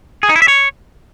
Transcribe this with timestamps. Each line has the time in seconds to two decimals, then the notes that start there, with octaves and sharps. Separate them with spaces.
0.23 G#4
0.29 D#4
0.36 E4
0.42 E5
0.48 C#5